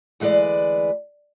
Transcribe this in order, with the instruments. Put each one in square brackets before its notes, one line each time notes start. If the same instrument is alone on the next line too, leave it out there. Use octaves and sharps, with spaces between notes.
[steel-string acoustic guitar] D2 E3 G#3 B4 D5